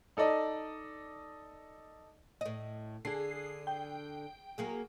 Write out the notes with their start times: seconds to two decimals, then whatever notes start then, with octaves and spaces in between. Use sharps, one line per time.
0.17 D#4 A4 D5 D#5
2.41 A2 D#5
3.05 D3 D4 G#4 C7
3.67 G5
4.58 F#3 A#3 G#4